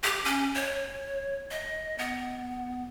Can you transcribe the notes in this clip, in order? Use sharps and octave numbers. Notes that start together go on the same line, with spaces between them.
G4
C#4
C#5
D#5
B3